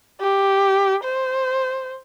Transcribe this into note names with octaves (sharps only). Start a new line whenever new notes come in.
G4
C5